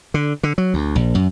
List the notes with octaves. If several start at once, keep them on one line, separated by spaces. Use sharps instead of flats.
D3
D3
F#3
D2
A#1
F#2